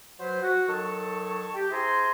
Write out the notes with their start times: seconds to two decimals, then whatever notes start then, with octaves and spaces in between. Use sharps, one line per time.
0.20 F#3 B4 C5
0.42 F#4
0.68 D#3 F#3 A4 A5 C#6
1.55 G4
1.71 E4 G#4 C5 G#5 A#5 C6